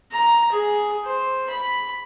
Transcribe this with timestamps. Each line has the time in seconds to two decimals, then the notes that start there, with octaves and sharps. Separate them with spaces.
0.12 A#5
0.51 G#4
1.04 C5
1.50 B5